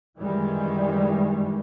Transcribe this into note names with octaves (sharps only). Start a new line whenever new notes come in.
F#2 D#3 E3 G3 G#3